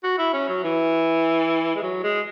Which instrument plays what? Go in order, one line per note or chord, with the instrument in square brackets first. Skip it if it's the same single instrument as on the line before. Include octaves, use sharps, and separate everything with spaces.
[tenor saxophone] F#4
E4
C#4
F#3
E3
G#3
F#3
G#3